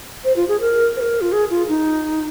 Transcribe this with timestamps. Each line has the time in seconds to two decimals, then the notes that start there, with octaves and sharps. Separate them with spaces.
0.24 C5
0.36 F4
0.48 G#4
0.60 A#4
0.96 C5
1.01 A#4
1.21 F4
1.32 G#4
1.50 F4
1.68 D#4